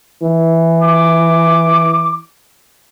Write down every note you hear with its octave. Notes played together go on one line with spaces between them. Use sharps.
E3
D6